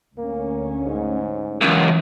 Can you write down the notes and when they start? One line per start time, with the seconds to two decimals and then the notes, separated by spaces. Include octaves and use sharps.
0.18 D2 A#3 C#4
0.86 G#2
1.61 C#2 F#2 E3 A#3